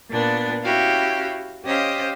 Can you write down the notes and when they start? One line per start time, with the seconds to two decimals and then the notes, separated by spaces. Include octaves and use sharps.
0.10 A#2 B3 D4 A6
0.64 C#4 E4 F#4 G4 F5
1.64 C#4 G4 C5 D#5 F5